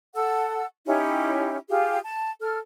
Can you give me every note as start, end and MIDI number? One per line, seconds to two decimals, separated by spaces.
0.14 0.65 69
0.14 0.65 78
0.14 0.65 88
0.86 1.56 61
0.86 1.56 63
0.86 1.56 64
0.86 1.56 67
1.69 1.99 65
1.69 1.99 67
1.69 1.99 68
1.69 1.99 77
2.04 2.29 81
2.40 2.58 69
2.40 2.58 89